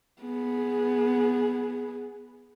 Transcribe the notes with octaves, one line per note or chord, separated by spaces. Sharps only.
B3 G#4